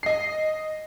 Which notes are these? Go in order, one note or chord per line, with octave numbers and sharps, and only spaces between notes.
D#5 C7